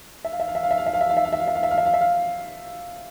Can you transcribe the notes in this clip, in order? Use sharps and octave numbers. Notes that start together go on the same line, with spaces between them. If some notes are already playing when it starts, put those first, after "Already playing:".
E5
F5
E5
F5
E5
F5
E5
F5
E5
F5
E5
F5
E5
F5
E5
F5
E5
F5
E5
F5
E5
F5
E5
F5